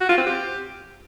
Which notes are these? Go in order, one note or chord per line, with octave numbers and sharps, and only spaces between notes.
F#4
F4
C4
G4